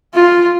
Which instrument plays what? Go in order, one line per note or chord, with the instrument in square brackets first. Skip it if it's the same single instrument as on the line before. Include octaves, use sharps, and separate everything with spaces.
[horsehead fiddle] F4